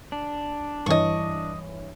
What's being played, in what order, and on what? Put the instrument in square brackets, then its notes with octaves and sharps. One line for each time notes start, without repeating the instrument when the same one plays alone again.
[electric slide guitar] D4
[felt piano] G2 E3 C#5 [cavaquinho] D#5 C#6